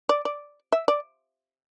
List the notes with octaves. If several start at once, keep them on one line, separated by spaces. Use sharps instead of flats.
D5
D5
E5
D5